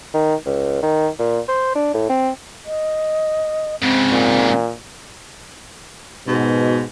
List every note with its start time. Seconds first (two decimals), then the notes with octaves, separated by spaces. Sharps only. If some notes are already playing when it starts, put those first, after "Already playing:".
0.14 D#3
0.46 C#2
0.83 D#3
1.19 A#2
1.48 C5
1.75 D4
1.94 A2
2.09 C4
2.66 D#5
3.82 G#2 C#3 C4
4.12 A#2
6.28 G#2 B2